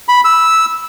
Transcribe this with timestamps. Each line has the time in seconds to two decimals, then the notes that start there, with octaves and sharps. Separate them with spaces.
0.08 B5
0.25 E6